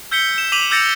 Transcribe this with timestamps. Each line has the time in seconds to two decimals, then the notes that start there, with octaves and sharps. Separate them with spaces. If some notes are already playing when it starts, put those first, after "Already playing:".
0.11 E6 G6 B6 C#7 G7
0.38 E7
0.52 D6 B6 D#7 F7 F#7
0.71 D6 E6 G6 A6 A#6 C#7